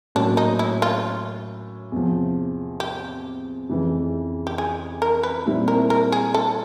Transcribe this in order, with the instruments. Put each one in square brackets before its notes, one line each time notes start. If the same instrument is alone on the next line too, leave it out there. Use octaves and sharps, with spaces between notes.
[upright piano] A2 F#3 A#3 C#4 [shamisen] D4
[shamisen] D#4
E4
F4
[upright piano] E2 C3 F3
[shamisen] G4
[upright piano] F2 C#3 E3
[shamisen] G4
G#4
A#4
B4
[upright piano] A#2 G3 C4 E4
[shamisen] A#4
A#4
G#4
A4